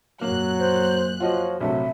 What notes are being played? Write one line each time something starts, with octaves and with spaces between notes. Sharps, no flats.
F#2 A#2 F#3 A#3 F#6
C5
F3 F4 F#4 C#5 D#5
A#1 C3 F#3 A3 E5